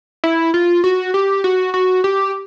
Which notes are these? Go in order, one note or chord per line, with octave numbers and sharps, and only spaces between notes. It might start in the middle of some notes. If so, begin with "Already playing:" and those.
E4
F4
F#4
G4
F#4
F#4
G4